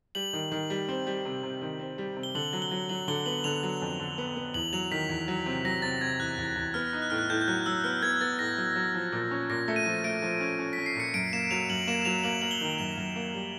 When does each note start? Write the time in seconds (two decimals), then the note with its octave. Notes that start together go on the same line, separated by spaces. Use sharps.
0.15 G3 F#7
0.33 D#3
0.52 D#3
0.70 G3
0.88 C4
1.07 G3
1.25 C3
1.43 C3
1.61 D#3
1.79 C4
1.98 G3
2.17 C3
2.23 G7
2.35 D3 F#7
2.53 F#3
2.62 G7
2.71 F#3
2.89 F#3 F#7
3.08 D3 G7
3.26 B3 F#7
3.44 D3 F7
3.63 F#3
3.82 F2
4.00 D3
4.18 B3
4.36 B3
4.54 E2 F#7
4.73 F#3 F7
4.91 D#3 B6
5.09 E2
5.28 F#3
5.46 C3
5.65 F#3 A#6
5.82 C3 A6
6.01 C3 G#6
6.20 E2 F#6
6.38 E2
6.56 E2
6.74 B3 F6
6.93 D#4
7.02 F#6
7.10 A2 F6
7.18 F#6
7.29 A2 G6
7.41 G6
7.48 F#3 F#6
7.66 F#3 E6
7.84 B3 F6
8.03 B3 G#6
8.21 B3 A6
8.39 A2 A#6
8.58 F#3
8.76 F#3
8.95 F3
9.12 A#2
9.31 C#4
9.50 A#2 A#6
9.68 A3
9.76 D#7
9.86 F3
10.04 A3 D7
10.22 F3
10.40 C#4
10.59 C#4
10.73 C#4 B6
10.86 C7
10.96 A#2 C#7
11.14 F#2 D7
11.32 A#3 E7
11.51 F#3 F7
11.70 F#2 F#7
11.87 A#3 E7
12.02 E7
12.05 F#3 F7
12.24 A#3 F#7
12.42 A#3 F#7
12.51 G7
12.61 D#3
12.78 F#2 F7
12.97 F#2
13.16 A#3
13.34 G3